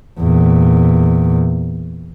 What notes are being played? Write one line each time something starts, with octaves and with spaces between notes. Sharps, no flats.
E2 A#2